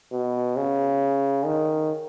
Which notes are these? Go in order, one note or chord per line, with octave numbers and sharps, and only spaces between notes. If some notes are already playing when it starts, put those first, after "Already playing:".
B2
C#3
D#3